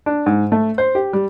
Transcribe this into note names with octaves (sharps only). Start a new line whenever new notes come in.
D4
G#2
A3
C5
G4
G3